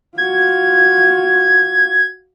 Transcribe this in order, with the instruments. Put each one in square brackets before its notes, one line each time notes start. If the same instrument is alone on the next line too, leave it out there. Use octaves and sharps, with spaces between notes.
[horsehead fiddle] F4 F#4 [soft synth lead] G#6